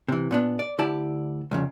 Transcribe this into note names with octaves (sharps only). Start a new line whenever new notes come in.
C3 E3
A#2 B3 D4
D5
D2 D3 E4 G4 D5 A5
C2 F2 C#3